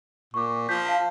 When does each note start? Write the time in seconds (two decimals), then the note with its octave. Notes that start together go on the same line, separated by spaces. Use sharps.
0.34 A#2 C#6 D6
0.69 F3 G6 B6
0.86 F5 A5